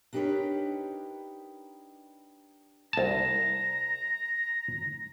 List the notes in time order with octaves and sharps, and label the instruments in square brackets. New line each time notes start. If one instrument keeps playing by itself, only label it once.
[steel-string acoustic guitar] D4 D#4 G4 A#4 B4 C#5
[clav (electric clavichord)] C2 A5 [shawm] A#5